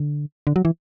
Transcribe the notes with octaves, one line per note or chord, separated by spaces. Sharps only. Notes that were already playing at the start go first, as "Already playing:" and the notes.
Already playing: D3
D3
F#3
E3